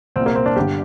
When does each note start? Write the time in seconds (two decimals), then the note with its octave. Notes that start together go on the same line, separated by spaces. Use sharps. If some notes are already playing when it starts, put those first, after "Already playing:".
0.16 C2 A#2 C4
0.26 A#3
0.35 C4
0.46 D4
0.56 G1 G2 D3 G4